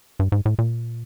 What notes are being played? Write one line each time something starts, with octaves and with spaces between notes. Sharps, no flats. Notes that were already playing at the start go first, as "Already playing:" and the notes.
G2
G#2
A2
A#2